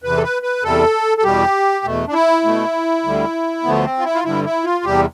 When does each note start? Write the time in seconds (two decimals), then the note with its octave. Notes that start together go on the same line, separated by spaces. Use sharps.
0.02 E2 C3 E3 B4
0.17 A4
0.23 B4
0.42 B4
0.63 E2 C3 G3 A4
1.18 A4
1.23 E2 B2 G3 G4
1.84 E2 B2 A3
2.07 D4
2.13 E4
2.44 B2 A3
3.03 D2 D3 G3
3.63 D2 D3 F3 A3 B3
3.84 C4
3.98 F4
4.04 E4
4.15 F4
4.24 G2 D3 G3 E4
4.44 E4
4.64 F4
4.84 E2 C3 G3 G4